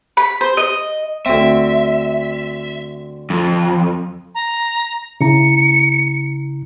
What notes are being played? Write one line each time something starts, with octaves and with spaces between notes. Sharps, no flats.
B5
C5
D#5
D2 C4 E5
F2
A#5
C#3 E4 A#5 C#7